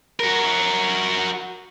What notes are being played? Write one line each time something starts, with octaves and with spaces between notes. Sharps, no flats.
F#4 A#4